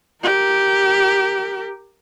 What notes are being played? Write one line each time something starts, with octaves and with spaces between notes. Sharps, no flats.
G4 A#4